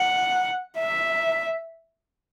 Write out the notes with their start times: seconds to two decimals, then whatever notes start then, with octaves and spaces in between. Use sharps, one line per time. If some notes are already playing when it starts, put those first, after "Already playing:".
Already playing: F#5
0.77 E5